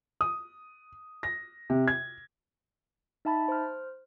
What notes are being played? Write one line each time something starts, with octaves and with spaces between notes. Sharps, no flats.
D#6
A#6
C3
G#6
D#4 E5 A5 B5 A6
C5 F6